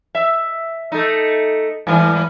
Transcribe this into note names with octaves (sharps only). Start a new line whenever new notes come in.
E5
A3 D#4
G#2 E3 G3